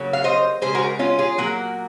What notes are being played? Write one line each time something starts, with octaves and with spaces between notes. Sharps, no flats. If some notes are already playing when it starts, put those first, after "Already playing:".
Already playing: C#3 F#3 A#3
F5
C5 D#5
C#3 G#3 G#4 C5
F#4 A#4
C#4 F4
F4 G#4
A#2 F#3 A#3 F#4 A#4